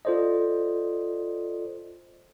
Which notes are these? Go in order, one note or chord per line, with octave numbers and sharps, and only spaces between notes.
F4 A4 C5 D5 D#5